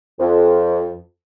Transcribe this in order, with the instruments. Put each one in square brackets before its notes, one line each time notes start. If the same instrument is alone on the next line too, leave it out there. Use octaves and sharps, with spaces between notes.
[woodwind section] F2